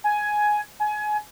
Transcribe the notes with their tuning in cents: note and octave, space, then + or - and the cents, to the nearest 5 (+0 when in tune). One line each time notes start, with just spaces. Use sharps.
G#5 +10
G#5 +25